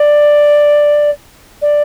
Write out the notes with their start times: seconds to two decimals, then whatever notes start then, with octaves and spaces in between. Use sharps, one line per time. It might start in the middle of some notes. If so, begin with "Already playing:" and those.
Already playing: D5
1.62 D5